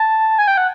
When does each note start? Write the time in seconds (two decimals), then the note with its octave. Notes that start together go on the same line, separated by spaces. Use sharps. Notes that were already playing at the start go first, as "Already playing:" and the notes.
Already playing: A5
0.38 G#5
0.48 G5
0.58 F#5